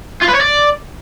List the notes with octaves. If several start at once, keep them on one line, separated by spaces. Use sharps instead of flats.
F4
B4
C#5
D5